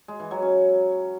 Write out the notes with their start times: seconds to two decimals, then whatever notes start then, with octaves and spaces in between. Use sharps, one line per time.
0.08 G#3
0.20 E3
0.31 F#3
0.42 C#4